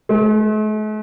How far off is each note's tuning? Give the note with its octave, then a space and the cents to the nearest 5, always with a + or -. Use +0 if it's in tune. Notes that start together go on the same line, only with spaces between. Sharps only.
A3 -45